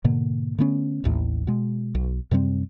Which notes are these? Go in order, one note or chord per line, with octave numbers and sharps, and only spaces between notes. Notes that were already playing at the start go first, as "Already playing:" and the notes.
G#2 B2 D3 A#3
D3 A3 B3 C#4
A1 D#2 A2
B2 G#3
B1
F#2 C3 G3 C4